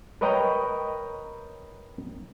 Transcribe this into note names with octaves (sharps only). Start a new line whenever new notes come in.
A#4 B4 C#5 D#5 G5 A#5